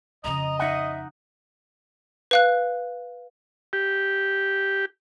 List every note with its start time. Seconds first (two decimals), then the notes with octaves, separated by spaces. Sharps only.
0.24 F2 C#3 D#5 A#5
0.59 D#4 E5 F#5
2.31 B4 F5 F#6
3.73 G4